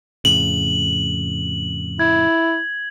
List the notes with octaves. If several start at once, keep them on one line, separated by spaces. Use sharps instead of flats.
F2 A2 C#3 F#7
E4 G#6